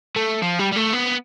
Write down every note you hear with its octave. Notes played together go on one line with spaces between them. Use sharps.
A3
F3
G3
G3
A3
B3